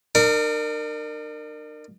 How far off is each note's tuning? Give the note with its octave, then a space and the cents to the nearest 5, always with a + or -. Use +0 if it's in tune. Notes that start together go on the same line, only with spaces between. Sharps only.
D4 +45 A#4 -15